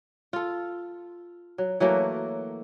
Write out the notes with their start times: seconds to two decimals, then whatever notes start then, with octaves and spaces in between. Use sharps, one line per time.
0.33 F4 A4
1.58 F#3
1.80 E3 F#3 A3 A#3